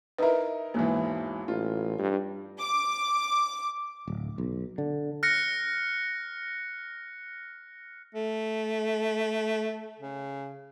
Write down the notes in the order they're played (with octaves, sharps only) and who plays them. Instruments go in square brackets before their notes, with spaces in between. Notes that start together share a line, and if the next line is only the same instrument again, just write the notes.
[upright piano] D#4 E4 A#4 [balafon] B4 E5
[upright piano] E1 G#2 E3 [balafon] A#3
[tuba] A1 [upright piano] F4
[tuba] G2
[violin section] D6
[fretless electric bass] D1
B1
D3
[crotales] F6 F#6 A#6 C#7
[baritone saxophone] A3
C#3